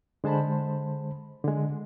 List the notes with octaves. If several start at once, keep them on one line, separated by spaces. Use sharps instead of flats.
D3 G#3 C5 A5 B5
D3 G#3